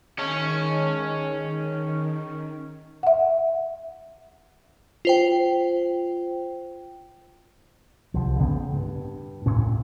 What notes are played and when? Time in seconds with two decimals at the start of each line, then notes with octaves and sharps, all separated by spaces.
0.19 D#3 C#4 G#4 D#5 A5
3.03 E5 F#5
5.05 F4 C5 G5
8.14 C2 F3
8.39 A1 C#3 B3 C4
8.73 G2
9.46 D2 A2 C#4